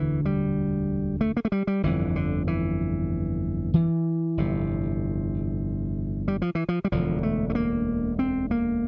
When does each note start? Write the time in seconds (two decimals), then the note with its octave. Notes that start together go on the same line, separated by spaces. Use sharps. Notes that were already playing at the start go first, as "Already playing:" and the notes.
Already playing: E1 D2 D3 E3
0.25 G3
1.21 A3
1.37 A#3
1.45 A3
1.52 G3
1.67 G3
1.83 G1 F2 D3 E3
2.16 D3
2.47 E3
3.74 E3
4.37 G1 F2 C3
6.28 G3
6.42 F3
6.55 E3
6.69 F3
6.84 G3
6.92 E1 D2 D3 F3
7.23 A3
7.50 A3
7.55 A#3
8.19 C4
8.51 A#3